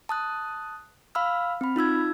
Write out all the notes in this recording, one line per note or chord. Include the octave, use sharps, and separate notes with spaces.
A5 D#6 F#6
F5 B5 E6 F6
C4 B5
D#4 F4 E6 G#6